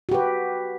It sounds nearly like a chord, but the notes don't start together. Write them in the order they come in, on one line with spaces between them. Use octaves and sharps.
F#4 G4 B4